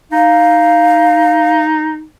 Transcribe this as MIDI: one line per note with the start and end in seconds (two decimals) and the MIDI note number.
0.12 2.05 63
0.12 1.60 77